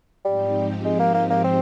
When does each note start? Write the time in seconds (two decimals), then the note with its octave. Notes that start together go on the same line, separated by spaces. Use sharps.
0.25 G#2 F3 G3 C4 D#4 G4
0.85 G#3
0.99 A#3
1.14 A#3
1.30 A#3
1.44 C4